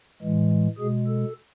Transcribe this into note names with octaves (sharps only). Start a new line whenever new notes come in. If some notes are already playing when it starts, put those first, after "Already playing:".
A2 E3 G#3
B2 G#3 G#4
A4